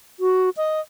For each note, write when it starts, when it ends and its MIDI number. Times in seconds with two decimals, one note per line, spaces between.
0.20 0.50 66
0.57 0.80 75